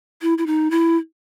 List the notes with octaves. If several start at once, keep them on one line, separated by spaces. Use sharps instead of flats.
E4
E4
D#4
E4